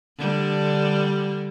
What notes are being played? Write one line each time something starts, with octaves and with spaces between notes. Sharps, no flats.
D3 G3 D4